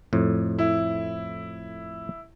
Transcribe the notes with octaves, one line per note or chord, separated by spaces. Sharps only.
F2 A2
E4